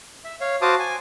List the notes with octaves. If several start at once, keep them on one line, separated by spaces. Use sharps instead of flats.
E5
C#5 F5
F#4 C5 F5 A5 D6 D#6
G#5